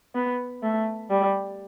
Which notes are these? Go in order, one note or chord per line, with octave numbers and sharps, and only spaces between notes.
B3
A3
G3